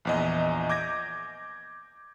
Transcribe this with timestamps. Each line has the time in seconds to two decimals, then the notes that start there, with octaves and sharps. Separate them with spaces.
0.05 A#1 E2 D#5
0.69 D6 G6 G#6 A#6